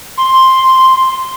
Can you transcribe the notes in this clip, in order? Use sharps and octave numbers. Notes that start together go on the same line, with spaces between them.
C6